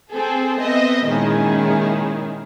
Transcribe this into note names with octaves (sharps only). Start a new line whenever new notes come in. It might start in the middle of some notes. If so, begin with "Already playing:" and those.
C4 G#4 A4
B3 C4 D#5 E5
A#2 D#3 G#3 C#4 E4 G#4